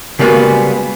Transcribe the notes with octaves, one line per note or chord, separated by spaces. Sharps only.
C#3 G3 G#3 A#3 B3 F#4